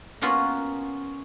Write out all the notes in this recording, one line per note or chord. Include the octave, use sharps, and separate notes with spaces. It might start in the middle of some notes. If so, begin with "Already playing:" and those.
A#3 B3 C#4 F4 F#4 B4